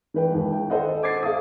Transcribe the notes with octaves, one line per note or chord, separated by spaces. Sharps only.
E3 B4 G5
D#2 G#3
G5
A4 C5 D#5 F#5
C5 D6 G#6 A6 C7
G#4 F5 A5 D#6